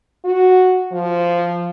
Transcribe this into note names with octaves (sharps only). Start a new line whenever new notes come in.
F#4
F3